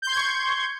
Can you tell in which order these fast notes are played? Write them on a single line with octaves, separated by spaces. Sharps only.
G6 C6 G#6 C#6